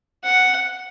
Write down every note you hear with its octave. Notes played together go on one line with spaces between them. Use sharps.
F#5